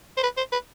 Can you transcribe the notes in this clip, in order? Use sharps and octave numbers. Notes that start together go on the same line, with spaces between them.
C5
B4
C5
B4